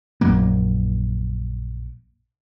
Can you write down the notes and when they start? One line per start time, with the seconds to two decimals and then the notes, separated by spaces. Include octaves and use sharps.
0.21 A#1 F#2 F#3 A#3